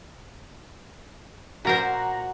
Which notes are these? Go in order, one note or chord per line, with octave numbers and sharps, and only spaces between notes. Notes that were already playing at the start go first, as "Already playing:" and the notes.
A#2 F#4 A#4 C5 F#5 A#5